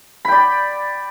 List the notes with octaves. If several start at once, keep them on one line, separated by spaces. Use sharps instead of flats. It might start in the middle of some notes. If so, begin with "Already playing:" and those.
D5 G5 B5